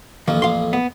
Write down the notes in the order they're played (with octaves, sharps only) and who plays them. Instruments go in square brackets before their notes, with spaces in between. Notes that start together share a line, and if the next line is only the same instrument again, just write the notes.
[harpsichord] A1 F2 A#3 [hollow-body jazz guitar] D#3
[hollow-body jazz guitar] F5 C6
B3